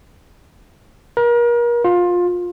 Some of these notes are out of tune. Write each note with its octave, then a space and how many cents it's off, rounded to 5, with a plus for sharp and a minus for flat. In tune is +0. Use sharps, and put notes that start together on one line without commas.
A#4 +35
F4 +20